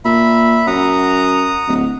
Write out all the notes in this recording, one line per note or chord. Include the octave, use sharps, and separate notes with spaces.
A#2 E5 B5
F#2 F#5 A#5 D#6
D1